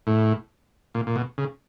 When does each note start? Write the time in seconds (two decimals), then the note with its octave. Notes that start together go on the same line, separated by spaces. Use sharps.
0.07 A2
0.95 A#2
1.07 A#2
1.16 B2
1.38 C#3